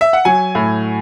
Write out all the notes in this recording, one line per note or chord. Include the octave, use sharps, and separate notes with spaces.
E5
F#5
F#3 G#5
A2